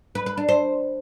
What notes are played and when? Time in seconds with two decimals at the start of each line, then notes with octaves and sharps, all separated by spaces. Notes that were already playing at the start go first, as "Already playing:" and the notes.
0.15 B4
0.26 B4
0.37 D4
0.49 C5